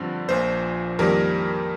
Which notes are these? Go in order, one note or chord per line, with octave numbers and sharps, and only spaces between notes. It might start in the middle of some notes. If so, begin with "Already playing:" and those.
Already playing: G2 D3 F3 C4
A#1 A#2 F3 C5
F2 D#3 G3 A#3 A#4